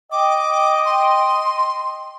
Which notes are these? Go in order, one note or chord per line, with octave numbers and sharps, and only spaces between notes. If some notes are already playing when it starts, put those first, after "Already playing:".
D#5 G5 D6
C6